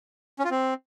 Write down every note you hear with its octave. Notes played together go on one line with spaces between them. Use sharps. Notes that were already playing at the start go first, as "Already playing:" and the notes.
C#4
F4
C4